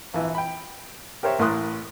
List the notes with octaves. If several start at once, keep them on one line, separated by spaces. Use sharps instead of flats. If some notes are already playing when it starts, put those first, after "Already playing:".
A#1 E3
G5 B5
G4 A#4 C5 C#5 E5
A1 A2 A#4 C6 D#6 F#6